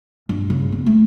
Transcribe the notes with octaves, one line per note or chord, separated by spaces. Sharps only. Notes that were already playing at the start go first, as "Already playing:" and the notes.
G2
C#3
B3
A3